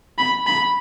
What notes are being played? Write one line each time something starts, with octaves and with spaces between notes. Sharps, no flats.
B5
B5